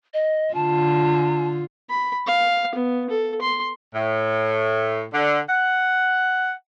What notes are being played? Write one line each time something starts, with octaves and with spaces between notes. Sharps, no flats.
D#5
D3 F4 A5
B5
F5
B3
A4
C6
A2
D3
F#5